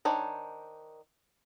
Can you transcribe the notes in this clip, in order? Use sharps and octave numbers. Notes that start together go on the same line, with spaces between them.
D#3 D4 C5 C#5